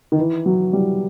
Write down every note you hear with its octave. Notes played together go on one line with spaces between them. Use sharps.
D#3
E3
F#3
G3